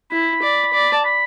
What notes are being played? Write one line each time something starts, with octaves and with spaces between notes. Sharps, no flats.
E4 B5
D5
D5
A5
B5